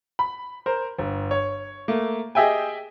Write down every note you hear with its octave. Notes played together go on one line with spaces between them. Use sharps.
B5
A#4 C5
G1
C#5
A3 A#3
G4 G#4 D#5 E5 G5 G#5